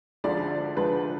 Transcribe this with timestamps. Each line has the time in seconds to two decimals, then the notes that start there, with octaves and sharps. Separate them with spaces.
0.24 D2 D3 F3 G#3 D5
0.77 D2 D3 F3 G#3 B4